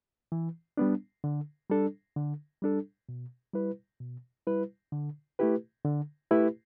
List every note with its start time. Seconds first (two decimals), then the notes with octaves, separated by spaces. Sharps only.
0.32 E3
0.77 G3 B3 D4
1.24 D3
1.70 G3 D4 A4
2.16 D3
2.62 G3 D4 A4
3.09 B2
3.54 G3 E4 B4
4.00 B2
4.47 G3 E4 B4
4.92 D3
5.39 A3 E4 G4 B4
5.85 D3
6.31 A3 E4 G4 B4